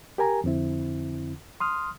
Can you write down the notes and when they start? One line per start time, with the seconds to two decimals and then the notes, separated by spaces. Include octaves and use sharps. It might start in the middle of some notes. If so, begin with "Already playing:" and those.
0.18 G4 A#4 G#5 A#5
0.44 F2 D3 C4 E4
1.60 C6 D#6 F6